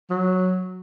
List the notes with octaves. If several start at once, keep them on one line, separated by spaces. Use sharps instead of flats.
F#3